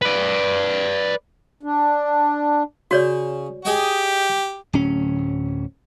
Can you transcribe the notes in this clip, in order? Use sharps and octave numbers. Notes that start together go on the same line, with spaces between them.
B4 D5
D4
C#3 F#4 C#5 D5
G4 G#4 D#5 G5
D1 C#4